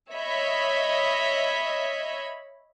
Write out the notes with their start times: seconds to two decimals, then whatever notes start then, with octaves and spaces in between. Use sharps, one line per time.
0.12 C#5 D#5 E5 B5